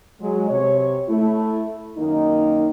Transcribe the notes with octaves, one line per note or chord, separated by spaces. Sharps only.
F#3 G#3
C3 C#5
A3 E4
F#2 D#3 A#3 D#4